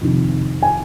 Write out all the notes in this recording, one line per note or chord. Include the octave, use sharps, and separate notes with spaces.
F2 C3 D#3
G#5